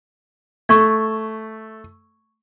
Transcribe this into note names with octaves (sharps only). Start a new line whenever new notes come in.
A3 C#6 G#6